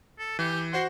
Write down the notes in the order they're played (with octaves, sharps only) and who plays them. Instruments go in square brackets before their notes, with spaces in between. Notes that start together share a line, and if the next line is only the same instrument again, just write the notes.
[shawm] A4
[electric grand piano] E3 [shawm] G4
[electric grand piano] F#4 C5 F#5 [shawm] C6